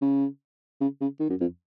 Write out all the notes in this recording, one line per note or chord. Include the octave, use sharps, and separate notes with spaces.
C#3
C#3
C#3
D#3
F#2
F2